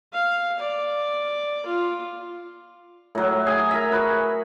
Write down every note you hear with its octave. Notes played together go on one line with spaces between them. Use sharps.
F5
D5
F4
A2 F#3
G#4 G#5
A#4 E5
F#4 B4